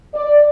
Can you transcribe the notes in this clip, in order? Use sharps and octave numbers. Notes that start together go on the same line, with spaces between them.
D5